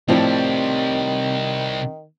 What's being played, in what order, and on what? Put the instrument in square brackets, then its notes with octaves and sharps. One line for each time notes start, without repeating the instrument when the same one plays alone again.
[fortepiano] A2 F3 [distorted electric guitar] C3 G3 [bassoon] D#3 [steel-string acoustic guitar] C4 C#5 D5